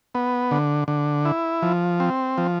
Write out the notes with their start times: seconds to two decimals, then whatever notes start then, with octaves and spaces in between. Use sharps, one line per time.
0.15 B3
0.51 D3
0.88 D3
1.25 E4
1.63 F3
2.00 C4
2.38 F3